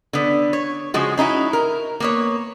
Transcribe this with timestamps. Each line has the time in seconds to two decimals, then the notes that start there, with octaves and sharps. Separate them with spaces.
0.13 D3 B3
0.53 C#5
0.94 C#3 F3 G#3 F#4
1.17 C#4 D#4 E4 F#4
1.53 A#4
2.00 A#3 B3 C#5